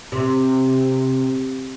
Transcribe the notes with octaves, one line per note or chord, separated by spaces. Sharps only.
C3